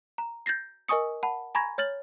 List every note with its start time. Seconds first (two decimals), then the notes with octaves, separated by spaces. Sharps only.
0.18 A#5
0.46 G6 A6 A#6 C7
0.88 A#4 D#5 G#5 C#6 D#6 C#7
1.23 F#5 A5 B5
1.55 G#5 A#5 B5 C#6 G#6 A#6
1.78 C#5 F6 A6 F#7